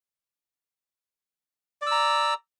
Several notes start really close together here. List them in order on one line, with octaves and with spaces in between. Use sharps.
D5 E6 A#5